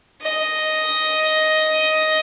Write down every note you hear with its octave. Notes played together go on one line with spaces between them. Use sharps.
D#5